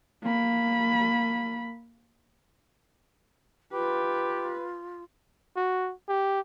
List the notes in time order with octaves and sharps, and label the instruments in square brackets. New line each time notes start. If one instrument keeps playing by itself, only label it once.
[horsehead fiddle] A#3 B5
[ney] F4 [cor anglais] G4 [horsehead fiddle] B4
[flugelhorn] F#4
G4